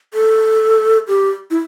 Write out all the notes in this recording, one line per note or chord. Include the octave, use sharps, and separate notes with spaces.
A4
G4
E4